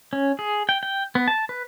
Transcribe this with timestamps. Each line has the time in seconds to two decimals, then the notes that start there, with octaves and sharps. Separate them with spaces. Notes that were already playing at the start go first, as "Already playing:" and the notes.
0.13 C#4
0.39 G#4
0.69 G5
0.83 G5
1.15 B3
1.28 A5
1.49 B4